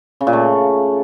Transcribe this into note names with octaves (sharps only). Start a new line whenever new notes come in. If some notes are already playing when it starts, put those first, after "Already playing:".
C#3
A#2
A3